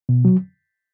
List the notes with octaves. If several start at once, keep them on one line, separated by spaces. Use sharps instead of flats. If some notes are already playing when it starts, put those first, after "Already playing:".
B2
F#3